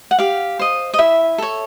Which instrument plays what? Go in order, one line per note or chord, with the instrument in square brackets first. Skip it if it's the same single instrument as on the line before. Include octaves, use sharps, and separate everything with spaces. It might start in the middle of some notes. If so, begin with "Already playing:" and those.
[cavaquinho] F#5
G4 F5
C5 D#5
D#5
E4 E5
A4 C#5